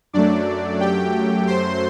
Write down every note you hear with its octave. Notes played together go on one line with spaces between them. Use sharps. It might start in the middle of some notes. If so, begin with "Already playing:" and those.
F#2 F#3 A3 D4 D5
G4 G5
C5 C6